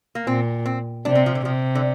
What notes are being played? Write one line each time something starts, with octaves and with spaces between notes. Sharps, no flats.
A#3
A#2 C4
C4
C3 D4
C4
F3
D3
C3 F3
D3